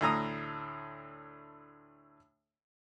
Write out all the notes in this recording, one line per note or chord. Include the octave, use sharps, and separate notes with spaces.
D2 A2 A#5 D#6